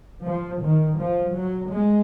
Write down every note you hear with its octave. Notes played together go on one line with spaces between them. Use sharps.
F3
D#3
F3
F#3
G#3